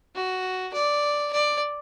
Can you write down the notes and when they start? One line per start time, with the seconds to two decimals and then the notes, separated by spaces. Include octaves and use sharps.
0.15 F#4
0.74 D5
1.33 D5